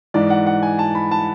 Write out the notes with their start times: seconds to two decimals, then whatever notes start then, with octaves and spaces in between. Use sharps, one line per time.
0.14 G#2 E3 G#3 D5
0.30 F#5
0.47 F#5
0.63 G#5
0.79 A5
0.95 B5
1.11 A5